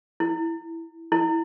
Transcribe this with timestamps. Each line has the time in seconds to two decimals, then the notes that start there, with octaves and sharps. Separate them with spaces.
0.20 E4
1.12 E4